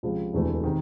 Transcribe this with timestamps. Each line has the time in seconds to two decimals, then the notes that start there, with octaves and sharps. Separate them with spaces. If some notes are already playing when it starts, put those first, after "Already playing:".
0.03 C#2 C3 F3
0.33 E1 D2 C3 E3 A3
0.63 C3 D#3